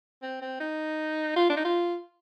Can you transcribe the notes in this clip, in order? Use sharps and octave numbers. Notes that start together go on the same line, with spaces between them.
C4
C4
D#4
F4
D4
D#4
F4